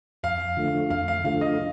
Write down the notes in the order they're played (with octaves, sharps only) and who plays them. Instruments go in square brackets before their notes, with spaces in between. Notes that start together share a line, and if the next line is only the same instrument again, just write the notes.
[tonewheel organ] F2 [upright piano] F5
[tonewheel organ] D3 F3 A3
[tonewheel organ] F2 [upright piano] F5
[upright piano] F5
[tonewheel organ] D3 F3 A3 [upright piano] F5
[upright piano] D#5